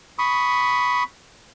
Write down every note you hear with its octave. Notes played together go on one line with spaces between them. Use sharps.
B5 C#6 D#6